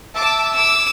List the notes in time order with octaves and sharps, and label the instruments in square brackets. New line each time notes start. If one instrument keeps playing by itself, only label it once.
[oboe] E5 [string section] A5 D6 E6
[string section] D6 [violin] E6